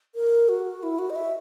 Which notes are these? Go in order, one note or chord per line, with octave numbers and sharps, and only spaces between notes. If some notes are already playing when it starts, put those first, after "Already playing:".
A#4
F#4
E4
F#4
D#5
E5